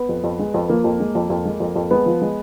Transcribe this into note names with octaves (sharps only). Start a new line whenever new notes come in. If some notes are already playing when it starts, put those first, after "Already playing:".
Already playing: B3
F2
F2
G#3
F2
F3 A#3
F2
G#3
F2
F2
G#3
F2
F2
G#3 B3
F3
G#3